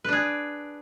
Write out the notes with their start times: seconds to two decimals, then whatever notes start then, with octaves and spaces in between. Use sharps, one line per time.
0.04 B4
0.09 D4
0.13 G#4